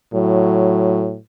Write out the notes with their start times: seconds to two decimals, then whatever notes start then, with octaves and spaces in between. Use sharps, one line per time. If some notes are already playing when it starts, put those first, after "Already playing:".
0.14 A2 F#3